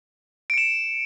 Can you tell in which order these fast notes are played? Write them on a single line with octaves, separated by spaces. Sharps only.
D7 C#7 E7